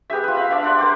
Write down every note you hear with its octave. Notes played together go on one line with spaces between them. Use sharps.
B3 G4 G#4 E5
F4 B4
E5 F5 B5
D4 D5 E5 F5
C5 D5 F#5 C6
A#4 C5 D6